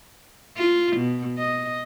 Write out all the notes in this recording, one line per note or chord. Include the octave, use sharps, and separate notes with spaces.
F4
B2
D#5